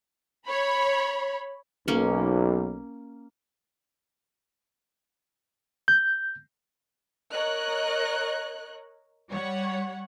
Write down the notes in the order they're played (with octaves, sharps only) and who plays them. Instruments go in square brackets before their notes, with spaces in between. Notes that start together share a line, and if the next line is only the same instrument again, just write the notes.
[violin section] C#5 B5
[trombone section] B1 [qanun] A#3 C#4
[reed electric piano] G6
[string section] A#4 C#5 D#5 F#6
G3 C#5 F#5